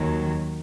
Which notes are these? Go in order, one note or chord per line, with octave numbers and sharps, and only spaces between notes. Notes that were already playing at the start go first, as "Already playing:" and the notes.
Already playing: D#2 D#3 F#3